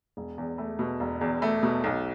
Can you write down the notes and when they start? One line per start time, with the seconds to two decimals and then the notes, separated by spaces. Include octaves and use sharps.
0.17 E1
0.38 E2
0.58 A3
0.79 B2
1.00 E1
1.21 E2
1.42 A3
1.63 B2
1.84 B1